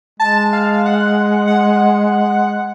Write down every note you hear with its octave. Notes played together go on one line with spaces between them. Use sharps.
G#3 A5
F5
F#5
F#5